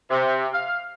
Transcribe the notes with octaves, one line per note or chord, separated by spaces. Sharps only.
C3
F5